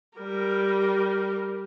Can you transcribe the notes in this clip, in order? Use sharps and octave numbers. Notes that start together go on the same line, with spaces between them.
G3 A#4